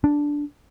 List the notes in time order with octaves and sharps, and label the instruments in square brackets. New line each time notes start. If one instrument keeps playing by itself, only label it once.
[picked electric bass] D4